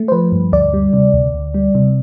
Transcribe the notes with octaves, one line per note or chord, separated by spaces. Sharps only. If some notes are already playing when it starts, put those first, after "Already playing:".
Already playing: A3
C5
F3 B4
G2
D2 D5
G3
C3
D2
D2
G3
C3